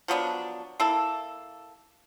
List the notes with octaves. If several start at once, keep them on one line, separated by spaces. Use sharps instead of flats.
F3 F#3 B3 D4
A#3 E4 A4